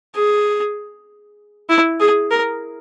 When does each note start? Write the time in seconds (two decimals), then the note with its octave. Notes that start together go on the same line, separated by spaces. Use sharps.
0.15 G#4
1.70 E4
2.00 G#4
2.31 A#4